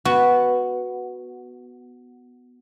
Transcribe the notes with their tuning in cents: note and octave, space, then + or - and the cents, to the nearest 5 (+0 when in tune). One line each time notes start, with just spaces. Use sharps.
B3 +0 F#4 +0